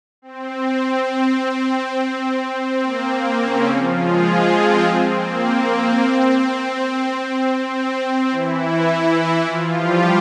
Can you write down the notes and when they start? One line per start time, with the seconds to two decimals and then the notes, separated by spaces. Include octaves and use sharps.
0.22 C4
0.80 C4
2.53 C4
2.82 A#3
3.40 C#3 C#4
3.68 F3 F4
3.97 G#3 G#4
4.27 F3 F4
4.56 C4
4.84 C4
5.13 A#3
5.42 C4
5.99 C4
7.73 C4
8.02 C4
8.31 E3 E4
9.46 F3 F4
9.75 G3 G4